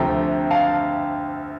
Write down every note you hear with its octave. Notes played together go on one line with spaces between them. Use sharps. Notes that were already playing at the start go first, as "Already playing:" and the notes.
Already playing: D2 C3 F3 A3 G5 A#5
F5 A5